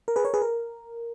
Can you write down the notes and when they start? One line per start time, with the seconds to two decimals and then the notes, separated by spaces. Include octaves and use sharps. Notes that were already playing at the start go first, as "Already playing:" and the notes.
0.08 A#4
0.16 G#4 B4
0.25 A#4 C#5
0.34 G#4 B4
0.42 A#4